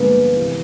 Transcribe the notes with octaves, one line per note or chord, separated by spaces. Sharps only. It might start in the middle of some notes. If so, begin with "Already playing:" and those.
Already playing: G2 D3 F3 G#3 A#3 B3
C3 E3